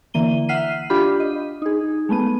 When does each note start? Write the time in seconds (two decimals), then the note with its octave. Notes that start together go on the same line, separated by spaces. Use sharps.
0.14 D3 E3 A#3 D#7 G7
0.49 E5 F#5 F6 B6 C7 D#7
0.90 D4 F4 G4 B5
1.20 D#5
1.62 D#4 G#4
2.09 G#3 A3 B3 D#7